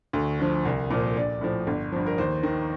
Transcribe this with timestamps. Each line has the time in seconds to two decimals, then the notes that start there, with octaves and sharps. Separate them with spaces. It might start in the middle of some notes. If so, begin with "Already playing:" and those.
0.13 D2
0.39 D3 F3
0.65 C2
0.90 A#2 F3
1.16 A#1 D5
1.41 A2 F3
1.67 G1
1.92 G2 F3
2.06 A#4
2.18 D#2 C5
2.43 D#3